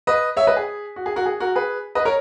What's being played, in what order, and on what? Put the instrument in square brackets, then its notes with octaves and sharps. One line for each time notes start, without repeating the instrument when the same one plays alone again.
[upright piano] B4 D#5
C#5 E5
B4 D#5
G#4
F#4
G#4
F#4 A#4
G#4
F#4 A#4
G#4 B4
B4 D#5
A#4 C#5